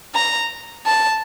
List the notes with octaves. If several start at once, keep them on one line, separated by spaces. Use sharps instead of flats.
A#5
A5